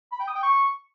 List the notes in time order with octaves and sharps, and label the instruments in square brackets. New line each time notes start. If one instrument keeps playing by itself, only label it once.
[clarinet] B5
G5
D#6
G5
C#6